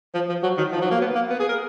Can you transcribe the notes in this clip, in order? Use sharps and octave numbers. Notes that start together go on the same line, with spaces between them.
F3
F3
F#3
D#3
F3
F#3
A#3
B3
A#3
B3
G#4
A#4